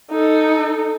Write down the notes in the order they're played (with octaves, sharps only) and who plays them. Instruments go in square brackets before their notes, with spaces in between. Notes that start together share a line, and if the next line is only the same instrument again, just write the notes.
[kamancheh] D#4 A4